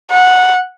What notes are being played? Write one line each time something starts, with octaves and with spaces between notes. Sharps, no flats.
F#5